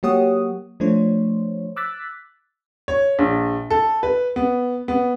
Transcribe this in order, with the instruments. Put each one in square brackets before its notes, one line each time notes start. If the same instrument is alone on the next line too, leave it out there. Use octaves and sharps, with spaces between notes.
[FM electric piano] F#3 A#3 G4 C#5 F#5 D#6
F3 A3 D4 C5 C#5
D6 E6 F#6 A6 B6
[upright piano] C#5
A#1
A4
B4
B3
B3